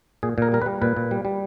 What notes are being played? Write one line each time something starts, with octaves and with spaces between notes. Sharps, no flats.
A#2 G#4
A#2 A#4
G3 A#4
B4
G3
A#2 B4
A#2
G3
G3